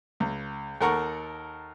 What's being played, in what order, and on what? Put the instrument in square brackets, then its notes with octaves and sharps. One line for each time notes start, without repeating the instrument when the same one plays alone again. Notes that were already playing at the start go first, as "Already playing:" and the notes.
[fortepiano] C#2
D#2 A4 A#4 F#5 A#5 C#6